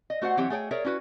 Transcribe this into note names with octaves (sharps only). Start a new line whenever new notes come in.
D#5
A3 F#4 C5 F#5
E3 F#3 C4 G4 C#5
A3 G#4 C#5 G5
G#4 A#4 C#5 D5 E5
C#4 E4 F#4 B4